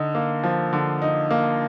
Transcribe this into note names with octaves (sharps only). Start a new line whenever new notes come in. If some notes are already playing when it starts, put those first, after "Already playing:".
Already playing: D3 D#4
A#3
F3
D3
D#4
A#3